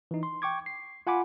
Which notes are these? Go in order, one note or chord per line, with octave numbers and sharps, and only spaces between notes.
E3 D#4
C6
G5 C#6 D6 G#6
C7
F4 F#5 G#5 B5 D6